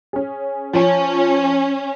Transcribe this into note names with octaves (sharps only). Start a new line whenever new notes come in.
C#4 G#4
F3 C#4